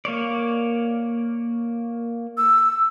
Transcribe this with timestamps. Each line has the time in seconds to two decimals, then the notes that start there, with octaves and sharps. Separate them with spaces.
0.05 A#3 C#5 D5
2.37 E6